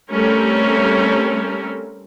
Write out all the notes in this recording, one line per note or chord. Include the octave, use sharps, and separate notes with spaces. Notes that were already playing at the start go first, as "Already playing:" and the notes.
G3 A3 C4 C#4 A4 A#4